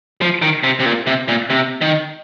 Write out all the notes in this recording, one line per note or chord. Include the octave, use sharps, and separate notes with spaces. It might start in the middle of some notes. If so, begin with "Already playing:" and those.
F3
D#3
C3
C3
A#2
C3
A#2
C3
D#3